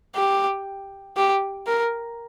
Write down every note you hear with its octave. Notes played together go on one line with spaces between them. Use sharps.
G4
G4
A#4